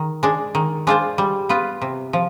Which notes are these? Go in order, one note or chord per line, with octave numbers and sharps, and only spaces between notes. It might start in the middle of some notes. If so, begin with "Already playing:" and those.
Already playing: D#3
G#3 D4
D#3
G#3 D4 F4 C5
G3
B3 F4 B4
C3
F3